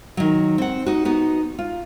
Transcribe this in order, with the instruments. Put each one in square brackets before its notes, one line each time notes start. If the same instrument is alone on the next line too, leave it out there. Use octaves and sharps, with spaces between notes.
[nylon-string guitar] D#3 F#3
C4 F#5
D#4 F#4
B3 D#4 F#4
F4